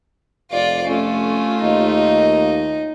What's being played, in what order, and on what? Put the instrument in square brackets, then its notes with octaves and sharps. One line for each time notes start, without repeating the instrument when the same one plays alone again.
[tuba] F1 [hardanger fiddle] F4 D5
[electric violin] A3 F4 [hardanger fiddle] C#4
[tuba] D#2 [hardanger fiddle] D#4